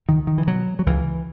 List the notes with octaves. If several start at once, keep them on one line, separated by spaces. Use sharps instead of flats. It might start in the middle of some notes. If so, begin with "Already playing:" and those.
C#2 D#3
D#3
E3
B2 F#3
F#3
C#2 E3